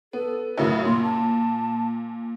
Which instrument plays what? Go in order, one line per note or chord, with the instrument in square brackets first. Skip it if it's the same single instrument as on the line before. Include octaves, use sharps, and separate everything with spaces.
[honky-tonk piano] B3 [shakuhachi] A4
[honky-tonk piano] F#2 A2 C#3 [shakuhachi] A#4
[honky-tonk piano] A#2 [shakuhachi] C6
[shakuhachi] A5